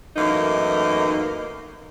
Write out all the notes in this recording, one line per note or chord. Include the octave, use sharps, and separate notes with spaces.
F#2 E3 A3 A#3 D#4